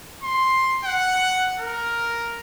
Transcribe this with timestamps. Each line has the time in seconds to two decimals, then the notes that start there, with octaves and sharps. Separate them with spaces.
0.23 C6
0.85 F#5
1.60 A#4